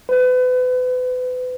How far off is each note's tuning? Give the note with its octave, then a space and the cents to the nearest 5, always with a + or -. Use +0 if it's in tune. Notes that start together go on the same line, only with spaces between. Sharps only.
B4 +35